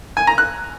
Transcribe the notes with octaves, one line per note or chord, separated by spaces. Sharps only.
G#5
A#5
F#6